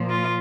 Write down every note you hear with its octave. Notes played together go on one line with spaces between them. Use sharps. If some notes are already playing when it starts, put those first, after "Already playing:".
Already playing: A#2 F3
F4